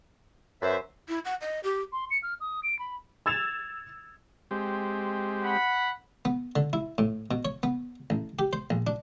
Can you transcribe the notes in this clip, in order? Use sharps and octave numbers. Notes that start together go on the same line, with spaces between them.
F#2 B4 C5 E5
E4
F#5
D#5
G4
C6
C#7
F6
D#6
D7
B5
E6 G#6 A6 E7 F7
G#3 C4 G4
F#5 B5
B3
D3
E4
A2
B2
C#5
B3
A1
G4
C5
A#1
D4